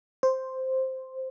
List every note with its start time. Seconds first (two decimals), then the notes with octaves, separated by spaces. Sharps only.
0.23 C5